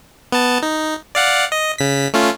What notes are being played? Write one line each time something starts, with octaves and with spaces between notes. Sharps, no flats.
B3 A5
D#4
D5 F5 F#5
D#5
C#3 B6
A3 C#4 F4